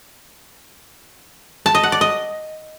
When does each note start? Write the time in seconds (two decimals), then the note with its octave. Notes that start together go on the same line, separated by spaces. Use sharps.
1.66 A5
1.75 D#5
1.83 F#5
1.92 D5
2.01 D#5